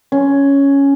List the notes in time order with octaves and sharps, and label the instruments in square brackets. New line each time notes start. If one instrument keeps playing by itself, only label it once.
[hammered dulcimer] C#4